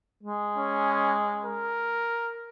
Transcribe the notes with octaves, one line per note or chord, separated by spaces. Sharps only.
G#3
C#4
A#4